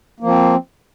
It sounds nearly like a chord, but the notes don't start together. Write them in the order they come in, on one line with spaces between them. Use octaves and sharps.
A#3 F3 C4